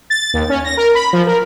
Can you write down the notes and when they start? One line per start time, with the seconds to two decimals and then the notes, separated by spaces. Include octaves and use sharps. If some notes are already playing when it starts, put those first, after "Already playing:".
0.10 A6
0.34 D#2
0.50 C#4
0.65 A#6
0.77 A#4
0.95 B5
1.13 F3
1.27 A#4